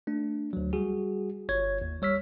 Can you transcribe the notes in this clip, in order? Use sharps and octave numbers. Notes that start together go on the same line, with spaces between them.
A3 D4
D2 F#3
G3 F#4 G#4
G1 C#5 G#6
D#2
G3 C#5 E6 F6 B6